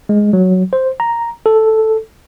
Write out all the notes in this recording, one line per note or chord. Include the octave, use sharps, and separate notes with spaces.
G#3
F#3
C5
A#5
A4